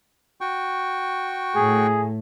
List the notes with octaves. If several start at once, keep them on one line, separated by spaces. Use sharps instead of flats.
F#4 G5 C#6
A2 G#4